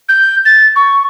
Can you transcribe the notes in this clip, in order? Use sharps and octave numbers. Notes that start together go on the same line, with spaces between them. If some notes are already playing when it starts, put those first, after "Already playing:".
G6
A6
C#6